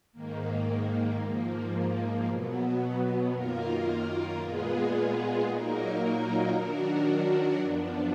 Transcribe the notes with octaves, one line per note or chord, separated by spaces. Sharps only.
G#2 D#3 A#3
G#2 F3 A#3
B2 F#3 B3
F#2 D#3 A#3 F4 A#4
A#2 G#3 B3 F4 G#4
A#2 F#3 A#3 D#4 A#4
D#3 F#3 D4 F#4 A#4
F#2 F3 B3 D4